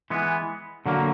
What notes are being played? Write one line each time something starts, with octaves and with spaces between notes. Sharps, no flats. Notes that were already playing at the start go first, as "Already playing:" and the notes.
E3 G#3 B3
D3 F#3 A#3